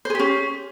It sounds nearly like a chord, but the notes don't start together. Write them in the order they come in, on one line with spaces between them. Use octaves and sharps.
C5 G#4 G4 C#4